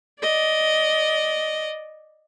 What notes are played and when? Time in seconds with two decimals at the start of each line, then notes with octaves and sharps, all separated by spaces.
0.21 D5 D#5